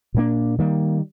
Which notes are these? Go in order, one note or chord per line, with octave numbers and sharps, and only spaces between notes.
A#2 G3 A#3 D4
D#3 G3 A#3